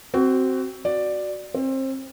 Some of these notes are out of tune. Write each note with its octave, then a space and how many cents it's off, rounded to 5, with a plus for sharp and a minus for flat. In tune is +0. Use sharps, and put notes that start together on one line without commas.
C4 +0 F#4 +20
F#4 +0 D5 +5
C4 +30 C5 +25